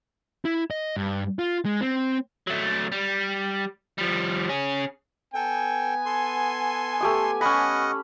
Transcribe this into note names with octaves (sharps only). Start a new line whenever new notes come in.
E4
D#5
G2
F4
G#3
C4
F#3 A3
G3
F3 G3
C#4 G#4
B3 A4 G5 G#5
A4 C6
A3 G4 D#6
C#4 D#5 F#5 B5